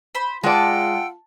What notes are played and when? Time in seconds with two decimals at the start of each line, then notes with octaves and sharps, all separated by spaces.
0.15 C5 B5
0.44 G#3 F4 D5 F#5 G5 A5 E6